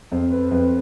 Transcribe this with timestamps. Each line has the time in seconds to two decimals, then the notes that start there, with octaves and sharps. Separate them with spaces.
0.12 F2 C5
0.31 B4
0.51 F2 B4